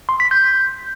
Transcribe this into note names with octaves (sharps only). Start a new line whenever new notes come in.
C6
B6
G6